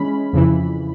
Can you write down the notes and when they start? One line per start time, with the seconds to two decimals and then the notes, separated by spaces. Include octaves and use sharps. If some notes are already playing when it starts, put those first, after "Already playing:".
Already playing: E3 G#3 C#4 B5
0.33 F2 C#3 E3